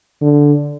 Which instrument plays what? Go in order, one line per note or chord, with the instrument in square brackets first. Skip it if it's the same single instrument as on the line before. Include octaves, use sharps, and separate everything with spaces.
[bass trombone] D3